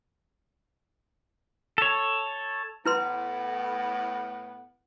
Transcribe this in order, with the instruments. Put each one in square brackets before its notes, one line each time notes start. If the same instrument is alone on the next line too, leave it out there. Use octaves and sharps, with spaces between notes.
[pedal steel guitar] A4 C#5
[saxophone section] A2 B3 [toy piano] E4 B4 C6